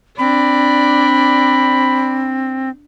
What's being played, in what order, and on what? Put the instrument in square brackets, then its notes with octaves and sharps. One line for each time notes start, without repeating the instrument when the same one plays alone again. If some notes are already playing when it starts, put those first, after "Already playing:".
[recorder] C4 [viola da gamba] D4 D5 [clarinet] B5